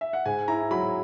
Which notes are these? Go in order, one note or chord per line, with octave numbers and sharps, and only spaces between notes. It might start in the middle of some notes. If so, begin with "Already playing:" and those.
E5
F#5
G#2 G#5
E4 A#5
F#3 B5